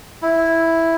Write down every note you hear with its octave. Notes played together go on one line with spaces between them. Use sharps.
E4